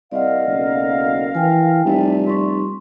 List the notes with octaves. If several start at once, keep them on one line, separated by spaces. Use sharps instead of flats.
C2 A#4 D5 D#5 F5 F#5
F#1 B1
E3 E4 G5 G#5
F1 G3 D5 E5
F1 C6 C#6